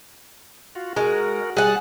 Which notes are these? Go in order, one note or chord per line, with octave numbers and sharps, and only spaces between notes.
F4 F#4
G#3 F#4 A#4
G3 G#4 F#5 A5 F#6